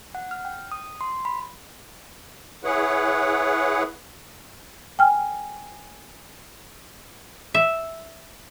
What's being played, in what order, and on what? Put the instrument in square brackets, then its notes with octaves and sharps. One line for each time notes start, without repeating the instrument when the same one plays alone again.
[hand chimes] F#5
F6
G5
D#6
C6
B5
[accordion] E4 G#4 B4 C#5 F#5
[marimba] G5 G#5 F6
[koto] E5